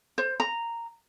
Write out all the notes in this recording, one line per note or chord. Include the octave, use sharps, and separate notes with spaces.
C5
A#5